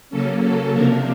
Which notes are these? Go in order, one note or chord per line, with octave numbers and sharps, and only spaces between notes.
C#3 F#3 A#3 C#4 A4
A4
C3 F3 A#3 D4 A#4